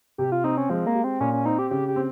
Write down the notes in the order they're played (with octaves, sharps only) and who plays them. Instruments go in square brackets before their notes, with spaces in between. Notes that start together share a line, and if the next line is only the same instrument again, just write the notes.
[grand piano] C3 [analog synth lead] G4
[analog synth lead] F4
[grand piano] C4 [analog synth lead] D#4
[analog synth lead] C#4
[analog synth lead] F3 [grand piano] G#3
[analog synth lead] A#3
[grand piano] G4
[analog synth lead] C4
[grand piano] A#2 [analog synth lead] C#4
[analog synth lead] C#4
[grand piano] C4 [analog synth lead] D#4
[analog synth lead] G4
[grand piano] C#3 [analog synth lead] G4
[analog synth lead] G4
[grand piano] C4